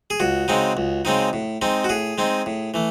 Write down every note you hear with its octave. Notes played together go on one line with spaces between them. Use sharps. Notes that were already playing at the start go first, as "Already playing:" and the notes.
G#4
C#2 F#4
C#3 G#3 C4 D#4
C#2
C#3 G#3 C4 D#4
A2
G#3 C4 D#4
F#4
A2 G#4
G#3 C4 D#4
A2
E3 A3